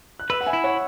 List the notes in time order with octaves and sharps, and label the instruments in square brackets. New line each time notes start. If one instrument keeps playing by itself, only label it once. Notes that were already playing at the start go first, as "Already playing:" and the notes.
[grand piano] F#6
[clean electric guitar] B4 [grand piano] B5 E6
[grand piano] F#5
E5 G#5
[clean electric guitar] E4
[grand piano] C#5 F#5